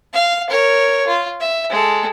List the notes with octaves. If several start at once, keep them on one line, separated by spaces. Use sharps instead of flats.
F5
A#4 C#5
F4
E5
G#3 A4